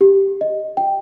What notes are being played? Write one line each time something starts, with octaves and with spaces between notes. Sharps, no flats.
G4
D#5
G5